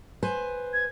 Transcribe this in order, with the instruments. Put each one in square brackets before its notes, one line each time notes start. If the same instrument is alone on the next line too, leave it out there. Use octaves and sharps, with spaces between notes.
[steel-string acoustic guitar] B4 C5 G#5
[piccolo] G#6